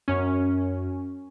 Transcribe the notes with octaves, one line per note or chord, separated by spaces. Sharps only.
F#2 C#4